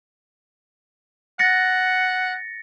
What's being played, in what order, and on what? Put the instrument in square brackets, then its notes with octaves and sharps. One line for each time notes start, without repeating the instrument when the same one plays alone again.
[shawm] F#5 [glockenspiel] A6 A#6 C#7